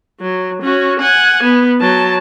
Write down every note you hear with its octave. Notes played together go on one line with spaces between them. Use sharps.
F#3
C#4 F#4
F#5 G#5
B3
F#3 A5